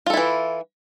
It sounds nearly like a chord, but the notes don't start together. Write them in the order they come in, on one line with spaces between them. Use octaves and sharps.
F4 A4 E4 E3